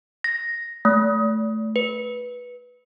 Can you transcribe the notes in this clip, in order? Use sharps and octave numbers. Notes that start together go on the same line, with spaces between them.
A#6
A3
B4